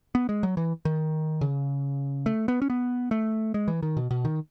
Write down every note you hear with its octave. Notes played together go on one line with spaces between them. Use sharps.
B3
G#3
F#3
E3
D#3
C#3
A3
B3
C#4
B3
A3
G#3
E3
D#3
B2
B2
D#3